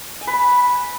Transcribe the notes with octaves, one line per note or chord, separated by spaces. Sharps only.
G#5
B4
B5